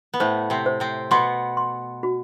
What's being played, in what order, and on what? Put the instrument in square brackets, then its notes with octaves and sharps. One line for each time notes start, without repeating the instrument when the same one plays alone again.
[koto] B3
[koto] A2 A3 [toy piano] C5
[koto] C3 C4
[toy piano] C5
[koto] C3 C4
[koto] B2 B3 [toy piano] C6
[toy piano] C6
F#4